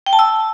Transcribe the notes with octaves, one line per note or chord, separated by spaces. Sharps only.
G5
A5
E6